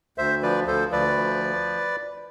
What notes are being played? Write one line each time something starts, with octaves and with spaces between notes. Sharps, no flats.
D2 C5 E5
F3 B4 D5
D2 A4 C5
D2 B4 D5
F3